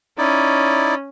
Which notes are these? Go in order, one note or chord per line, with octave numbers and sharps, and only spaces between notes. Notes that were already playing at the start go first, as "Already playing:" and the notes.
C#4 D#4 E4 D5